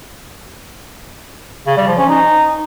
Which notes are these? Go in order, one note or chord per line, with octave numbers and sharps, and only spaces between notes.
C#3
G3
F3
C#4
D#4